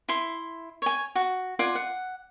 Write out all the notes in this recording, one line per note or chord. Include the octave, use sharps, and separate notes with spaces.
E4 C6
C#5 G#5
F#4
F4 D5 F#5 G#5
F#5